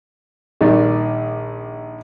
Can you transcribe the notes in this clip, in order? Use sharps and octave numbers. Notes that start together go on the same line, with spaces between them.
A#1 D#3 G3 D5